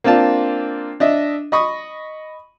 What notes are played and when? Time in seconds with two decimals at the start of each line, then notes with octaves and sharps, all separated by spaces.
0.04 A#3 C4 D4 F4 A5
1.00 D4 D#5 E5
1.52 D#5 B5 C#6 D#6